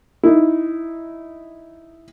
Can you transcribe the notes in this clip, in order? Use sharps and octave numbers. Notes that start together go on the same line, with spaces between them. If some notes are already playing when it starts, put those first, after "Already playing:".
D#4 E4